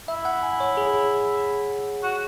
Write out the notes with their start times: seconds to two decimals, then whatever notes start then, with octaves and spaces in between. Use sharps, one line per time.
0.08 E4 E5
0.25 F#5
0.43 G#5
0.60 C#5
0.77 G#4
2.03 F#4